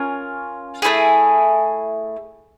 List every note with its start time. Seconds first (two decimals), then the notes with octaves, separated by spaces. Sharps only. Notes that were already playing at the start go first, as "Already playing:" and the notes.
Already playing: C#4 F4 A#4 C#5
0.82 A3 C#4 E4 G#4